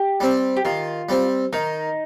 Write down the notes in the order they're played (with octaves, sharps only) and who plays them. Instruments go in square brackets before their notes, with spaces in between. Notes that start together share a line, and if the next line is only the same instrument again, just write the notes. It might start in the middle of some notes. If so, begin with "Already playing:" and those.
Already playing: [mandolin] G4
[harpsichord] G3 C4
[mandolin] G4
[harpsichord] D#3 [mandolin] F4
[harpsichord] G3 C4
[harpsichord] D#3 [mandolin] D#4